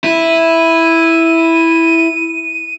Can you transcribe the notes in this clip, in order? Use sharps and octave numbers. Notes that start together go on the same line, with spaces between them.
E4 D#7